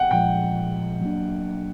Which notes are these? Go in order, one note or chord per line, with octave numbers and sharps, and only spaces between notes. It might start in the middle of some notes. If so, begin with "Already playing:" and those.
Already playing: F#5 G5
A#2 F3 G#3 G5
F#3 A#3 D4